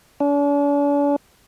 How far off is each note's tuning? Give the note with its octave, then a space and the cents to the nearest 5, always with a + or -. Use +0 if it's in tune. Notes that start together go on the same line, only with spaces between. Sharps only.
D4 -45